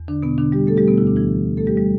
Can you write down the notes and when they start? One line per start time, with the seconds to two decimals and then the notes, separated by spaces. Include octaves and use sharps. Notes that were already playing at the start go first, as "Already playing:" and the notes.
Already playing: E2
0.08 D3 D4
0.23 B2 B3
0.38 D3 D4
0.52 G3 G4
0.67 A3 A4
0.77 G3 G4
0.88 B2 B3
0.98 D2 D3 E4
1.07 D4
1.16 E3 E4
1.57 A3 A4
1.67 G3 G4
1.77 G3